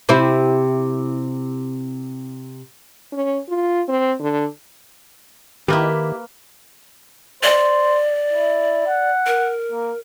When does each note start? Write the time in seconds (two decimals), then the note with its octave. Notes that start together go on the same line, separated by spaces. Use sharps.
0.09 C3 C4 E4
3.12 C#4
3.49 F4
3.88 C4
4.20 D3
5.68 D#3 A#3 E4 G4 B4
7.43 C5 D5
8.33 E4
8.86 F#5
9.26 A#4
9.72 A#3